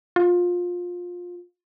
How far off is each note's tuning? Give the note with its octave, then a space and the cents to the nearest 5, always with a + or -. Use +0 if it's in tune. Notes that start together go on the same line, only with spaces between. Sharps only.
F4 +20